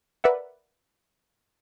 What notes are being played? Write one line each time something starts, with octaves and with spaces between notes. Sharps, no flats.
A#4 B4 D5 E5 F#5